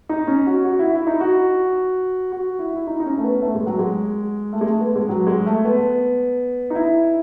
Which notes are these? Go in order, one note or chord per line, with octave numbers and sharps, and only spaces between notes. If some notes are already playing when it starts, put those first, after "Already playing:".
D#4
C#4
F#4
F#4
E4
E4
D#4
F#4
F#4
E4
E4
D#4
D#4
C#4
A3
B3
A3
G#3
F#3
G#3
A3
G#3
A3
B3
G#3
F#3
G#3
A3
B3
D#4
E4